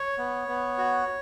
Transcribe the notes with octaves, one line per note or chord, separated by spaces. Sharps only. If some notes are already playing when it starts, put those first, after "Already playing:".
Already playing: C#5
B3
B3
F#4